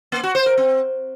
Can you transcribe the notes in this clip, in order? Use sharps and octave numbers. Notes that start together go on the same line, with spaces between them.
A#3
F#4
C5
A#4
C4